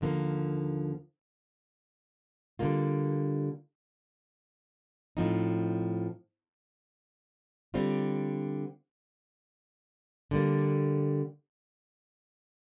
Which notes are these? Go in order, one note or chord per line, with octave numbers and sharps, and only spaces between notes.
D#2 D3 F3 A#3
D3 G3 A#3 F4
A2 F3 C4 D#4
D3 G3 C4 F4
D3 G3 A#3